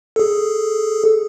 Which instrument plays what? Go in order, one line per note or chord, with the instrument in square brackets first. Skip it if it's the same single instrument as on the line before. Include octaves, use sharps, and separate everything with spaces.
[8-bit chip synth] G#4 A4